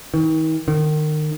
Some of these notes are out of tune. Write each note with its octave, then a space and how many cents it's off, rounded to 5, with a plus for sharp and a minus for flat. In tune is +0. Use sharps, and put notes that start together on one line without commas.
D#3 +40
D#3 -30